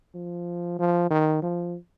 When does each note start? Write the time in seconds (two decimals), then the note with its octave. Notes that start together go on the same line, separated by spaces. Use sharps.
0.14 F3
0.79 F3
1.10 D#3
1.42 F3